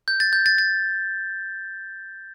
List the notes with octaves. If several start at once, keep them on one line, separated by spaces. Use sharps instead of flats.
G6
A6
G6
A6
A6